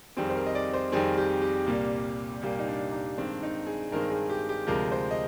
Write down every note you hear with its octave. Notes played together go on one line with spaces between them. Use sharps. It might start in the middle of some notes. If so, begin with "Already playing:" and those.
F2 D#3 G3 C4 G#4
C5
A#4
D#5
D5
C5
F2 D#3 G3 C4 G#4
G4
G4
C2 A#2 G3 A#3
C2 A#2 G3 A#3 G4
D#4
D4
D#4
G2 D#3 G#3 C4 D4
D#4
G#4
G2 D#3 G#3 C4 A#4
G#4
G4
G4
D2 C3 F3 G#3 A#4
C5
D#5